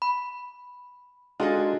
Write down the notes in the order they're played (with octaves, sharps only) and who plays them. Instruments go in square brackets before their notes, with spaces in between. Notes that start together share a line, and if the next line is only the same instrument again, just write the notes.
[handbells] B5
[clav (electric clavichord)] G#3 D#4 F4 [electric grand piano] D4 D#5 [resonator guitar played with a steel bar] F#4 G#4 A4